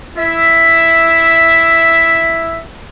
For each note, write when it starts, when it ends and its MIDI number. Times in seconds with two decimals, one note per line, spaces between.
0.17 2.62 64
0.17 2.62 76